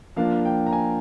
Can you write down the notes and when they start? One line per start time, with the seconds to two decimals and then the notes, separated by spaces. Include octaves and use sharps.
0.16 F3 A#3 D4 F5
0.45 G5
0.67 A#5
0.73 G#5